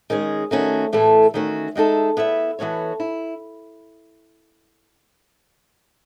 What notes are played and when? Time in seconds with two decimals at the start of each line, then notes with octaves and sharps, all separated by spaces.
0.10 D#3 G#3 C#4 G#4
0.51 D#3 A3 C#4 F#4
0.93 A2 E3 A3 E4 A4
1.34 D#3 A3 C#4 F#4
1.75 G#3 D#4 F#4 A4 E5
2.17 B3 E4 B4 E5
2.59 E3 B3 F#4 A4 C#5
3.00 E4